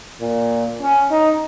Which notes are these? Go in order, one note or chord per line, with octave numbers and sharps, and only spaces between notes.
A#2
C#4
D#4